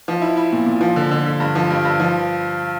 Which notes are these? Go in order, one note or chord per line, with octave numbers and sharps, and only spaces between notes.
F3
E4
E4
A#2
A#2
F3
D3
D3
D3
G2
F3
G2
G2
F3